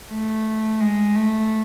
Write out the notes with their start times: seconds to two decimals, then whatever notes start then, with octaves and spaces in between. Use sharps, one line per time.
0.11 A3
0.80 G#3
1.15 A3